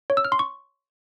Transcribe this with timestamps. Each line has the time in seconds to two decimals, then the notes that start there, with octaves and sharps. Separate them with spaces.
0.10 C#5
0.17 E6
0.25 F6
0.32 C6
0.39 C#6